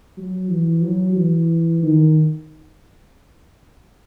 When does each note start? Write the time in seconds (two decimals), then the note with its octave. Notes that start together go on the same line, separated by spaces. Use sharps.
0.17 F#3
0.50 E3
0.83 F#3
1.16 E3
1.82 D#3